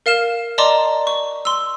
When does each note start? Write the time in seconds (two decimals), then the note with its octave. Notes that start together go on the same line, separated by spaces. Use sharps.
0.06 A#4 F5 F6 E7
0.58 D5 D#5 A5 A#5 C6 D6
1.07 C#6
1.45 C6 E6